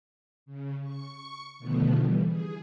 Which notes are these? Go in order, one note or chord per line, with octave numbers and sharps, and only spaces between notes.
C#3
C#6 C#7
B2 D3 D#3 F3 A3 B3
E3 G3
G#4